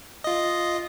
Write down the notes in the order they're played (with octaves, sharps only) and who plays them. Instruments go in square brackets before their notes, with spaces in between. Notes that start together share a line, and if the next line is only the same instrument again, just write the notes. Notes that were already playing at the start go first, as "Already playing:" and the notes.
[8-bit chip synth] F4 D#5